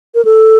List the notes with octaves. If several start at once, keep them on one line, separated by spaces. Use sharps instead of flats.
A#4
A4